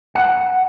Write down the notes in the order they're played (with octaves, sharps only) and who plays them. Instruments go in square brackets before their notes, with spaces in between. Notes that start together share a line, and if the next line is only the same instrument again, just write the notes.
[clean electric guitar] F#5